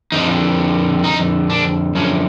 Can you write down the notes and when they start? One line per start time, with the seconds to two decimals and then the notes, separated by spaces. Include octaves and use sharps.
0.12 F2 D3 F3 D#4
1.04 D#4
1.50 D4
1.95 F#2 D3 F3 C#4